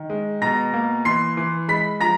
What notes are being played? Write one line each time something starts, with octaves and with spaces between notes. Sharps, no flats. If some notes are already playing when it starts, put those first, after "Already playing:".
Already playing: D#3
G#3
B2 A#5 A#6
A#3
E3 C6 C7
E3
G#3 B5 B6
F3 A#5 A#6